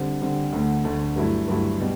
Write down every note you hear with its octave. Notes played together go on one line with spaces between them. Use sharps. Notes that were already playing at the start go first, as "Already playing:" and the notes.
Already playing: D3 G3 C4
D3 G3 C4
D2 D3 A3
D2 D3 A3
G2 F#3 A3 E4
G2 F#3 A3 E4
B2 G3